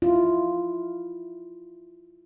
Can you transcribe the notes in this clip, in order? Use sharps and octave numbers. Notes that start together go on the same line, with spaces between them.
E4 F4